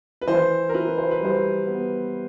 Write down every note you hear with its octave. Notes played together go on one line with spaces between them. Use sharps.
B4
E3 C5
A#4
E4 B4
C5
B4
G3 C5
B3